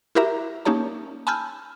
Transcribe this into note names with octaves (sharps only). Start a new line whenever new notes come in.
E4 F#4 G4 A#4 E5 A#5
A#3 C#4 D#4 G4 C#5 A5
G#5 A5 B5 E6 F6 G6